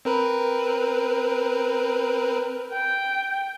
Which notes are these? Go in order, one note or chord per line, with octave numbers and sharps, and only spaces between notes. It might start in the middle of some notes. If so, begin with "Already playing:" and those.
C4 A#4 B4
G5